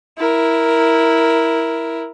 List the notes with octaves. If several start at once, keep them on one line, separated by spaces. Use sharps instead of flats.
E4 A#4